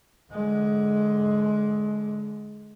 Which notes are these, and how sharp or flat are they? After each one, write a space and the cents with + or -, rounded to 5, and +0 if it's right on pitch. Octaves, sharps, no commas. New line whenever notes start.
D3 +0 G#3 +20